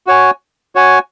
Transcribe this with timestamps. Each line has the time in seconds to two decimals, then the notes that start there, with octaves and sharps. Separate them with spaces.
0.07 F#4 C#5 G#5
0.75 F#4 C#5 G#5